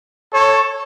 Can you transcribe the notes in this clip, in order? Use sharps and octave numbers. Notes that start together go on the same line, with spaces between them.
A4 C#5